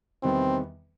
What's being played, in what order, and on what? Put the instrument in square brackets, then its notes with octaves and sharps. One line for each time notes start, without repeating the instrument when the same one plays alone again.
[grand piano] E2 C3 D#3 G3 B3 [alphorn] C4